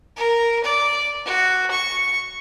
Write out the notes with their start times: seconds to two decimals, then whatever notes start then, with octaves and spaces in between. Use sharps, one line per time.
0.17 A#4
0.64 D5
1.26 F#4
1.71 C#6